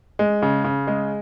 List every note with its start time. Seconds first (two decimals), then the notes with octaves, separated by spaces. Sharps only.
0.19 G#3
0.42 C#3
0.64 C#3
0.87 G#3